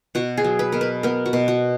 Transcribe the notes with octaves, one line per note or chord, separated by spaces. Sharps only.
B2 F#4
G#4
F#3
B4
B2 A#4
B4
B3 A#4
F#4
B2
F#4